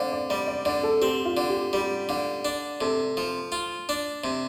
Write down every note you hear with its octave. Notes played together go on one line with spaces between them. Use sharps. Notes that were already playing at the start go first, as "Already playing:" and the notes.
Already playing: D3 C5 F5
D5
G3 D5
D5
D3 D5
A4
C4 G4
F4
D3
G4
G3 G4
D3 F5
D4 D5
C3 A4
F3
F4
D4
C3